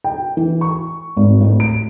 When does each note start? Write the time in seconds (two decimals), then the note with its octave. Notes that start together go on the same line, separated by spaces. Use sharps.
0.04 G5
0.37 E3
0.61 C#6
1.16 G#1
1.41 A1
1.60 D7